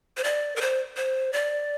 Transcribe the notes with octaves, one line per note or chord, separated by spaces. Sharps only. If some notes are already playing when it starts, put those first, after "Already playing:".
C5
D5
A#4
C5
C5
D5